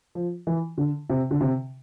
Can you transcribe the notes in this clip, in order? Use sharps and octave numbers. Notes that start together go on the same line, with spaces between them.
F3
E3
D3
C3
D3
C3